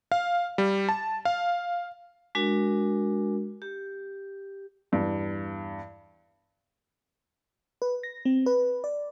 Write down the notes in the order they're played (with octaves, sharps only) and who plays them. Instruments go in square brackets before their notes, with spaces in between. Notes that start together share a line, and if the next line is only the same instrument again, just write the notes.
[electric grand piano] F5
G3
A5
F5
[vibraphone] G#3 D4 F#4 A#4
G4
[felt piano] E2 G2
[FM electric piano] B4
A#6
C4
B4
D5